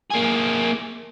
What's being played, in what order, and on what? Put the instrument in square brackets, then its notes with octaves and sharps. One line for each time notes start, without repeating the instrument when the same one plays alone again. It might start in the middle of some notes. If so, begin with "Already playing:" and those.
[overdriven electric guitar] A#3 G#4